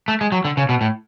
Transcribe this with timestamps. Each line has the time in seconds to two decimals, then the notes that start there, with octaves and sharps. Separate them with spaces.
0.08 A3
0.21 G#3
0.32 F#3
0.45 D3
0.57 C#3
0.69 B2
0.81 A2